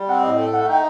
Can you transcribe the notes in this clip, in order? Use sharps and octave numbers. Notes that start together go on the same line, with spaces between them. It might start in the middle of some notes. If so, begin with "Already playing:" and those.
Already playing: G3
C4 F#5
A2 D#5
A4
A3 F#5
D#4 G5